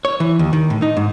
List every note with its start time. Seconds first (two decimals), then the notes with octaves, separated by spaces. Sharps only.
0.05 C#5
0.20 E3
0.39 D#2
0.53 D#3
0.70 A2
0.82 D#4
0.97 G#2